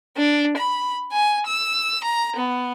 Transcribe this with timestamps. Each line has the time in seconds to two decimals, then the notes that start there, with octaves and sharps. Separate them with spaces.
0.17 D4
0.57 B5
1.12 G#5
1.47 E6
2.04 A#5
2.36 B3